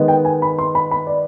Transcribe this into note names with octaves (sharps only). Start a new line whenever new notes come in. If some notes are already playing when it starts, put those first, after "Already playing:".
Already playing: D#3 G#3 B3
G5
G#5
B5
C6
B5
B5
D5